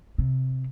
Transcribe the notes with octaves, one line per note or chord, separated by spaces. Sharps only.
C3